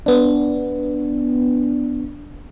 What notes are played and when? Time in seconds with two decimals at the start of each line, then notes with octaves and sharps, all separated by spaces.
0.06 B3 D4